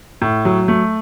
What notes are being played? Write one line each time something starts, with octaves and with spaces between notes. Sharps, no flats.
A2
F#3
A3